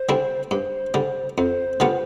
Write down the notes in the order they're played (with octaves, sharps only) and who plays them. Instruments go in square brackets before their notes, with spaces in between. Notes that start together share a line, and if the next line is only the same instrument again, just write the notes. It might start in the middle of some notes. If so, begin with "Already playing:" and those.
Already playing: [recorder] C5
[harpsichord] D3 G3 C4 E4
[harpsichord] G2 [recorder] C5
[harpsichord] D3 G3
[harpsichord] F2 [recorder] C5
[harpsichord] D3 G3 B3 F4